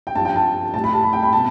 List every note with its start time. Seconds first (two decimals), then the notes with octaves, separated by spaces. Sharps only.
0.07 G5
0.15 G2 A5
0.19 F3
0.25 G5
0.36 A5
0.74 A2 G3 A5
0.84 B5
0.93 A5
1.03 B5
1.13 G5
1.23 B5
1.33 B2 A5